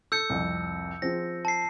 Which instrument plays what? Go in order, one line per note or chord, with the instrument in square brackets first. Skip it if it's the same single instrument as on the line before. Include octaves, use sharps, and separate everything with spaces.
[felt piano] A4 [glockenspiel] E6 G6 C#7
[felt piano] C2 F2
[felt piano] F3 C4 G#4 [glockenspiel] A#6
[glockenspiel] A5 C7